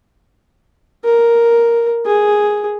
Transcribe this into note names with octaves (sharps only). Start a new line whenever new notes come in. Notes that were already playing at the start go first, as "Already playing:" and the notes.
A#4
G#4